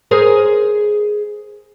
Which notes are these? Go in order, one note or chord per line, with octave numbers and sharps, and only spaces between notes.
G#4 A#4 C5